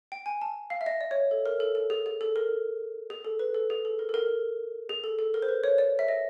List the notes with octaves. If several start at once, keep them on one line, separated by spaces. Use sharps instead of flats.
G5
G#5
A5
F5
E5
D#5
D5
C#5
A4
A#4
A4
A4
G#4
G#4
A4
A#4
G#4
A4
B4
A4
G#4
A4
A#4
A4
A#4
G#4
A4
A4
A#4
C5
B4
C#5
D5
E5
D#5